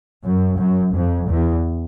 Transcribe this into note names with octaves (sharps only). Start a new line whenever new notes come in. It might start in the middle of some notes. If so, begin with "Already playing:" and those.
F#2
F#2
F2
E2